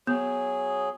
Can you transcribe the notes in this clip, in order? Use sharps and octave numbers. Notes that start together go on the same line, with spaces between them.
F#3 B3 G#4